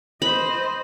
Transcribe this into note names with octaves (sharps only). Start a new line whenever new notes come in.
C5 D#5 B5